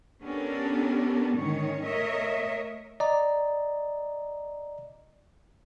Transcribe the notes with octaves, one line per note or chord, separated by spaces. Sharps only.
B3 C#4 D4 G4 A4 A#4
G#2 D3 D#3 C#4 D#4 C#5
A3 A#4 C#5 D#5 E5
D5 D#5 A#5